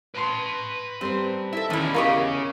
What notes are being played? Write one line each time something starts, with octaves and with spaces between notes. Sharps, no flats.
B4 A5 C6 D7
G3 C4 A#4 C5
E4 A4 E5
E2 D#3 G3 C#4 E4
C#4 G4 G#4 A#4 D#5 F5 C#6 D7